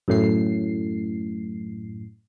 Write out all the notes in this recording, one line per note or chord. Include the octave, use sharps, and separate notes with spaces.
F#2 A2 C7